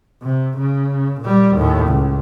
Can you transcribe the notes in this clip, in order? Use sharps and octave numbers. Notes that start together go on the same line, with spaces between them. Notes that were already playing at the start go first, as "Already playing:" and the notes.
C3
C#3
A#2 G3
D#2 A2
C#2